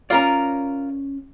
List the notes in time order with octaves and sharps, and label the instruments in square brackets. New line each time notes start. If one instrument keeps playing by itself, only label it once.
[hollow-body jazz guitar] C#4 D5 [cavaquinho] F4 A#4 A#5